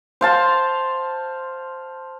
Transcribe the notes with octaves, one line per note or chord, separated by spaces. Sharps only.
C5 F5 A5 C6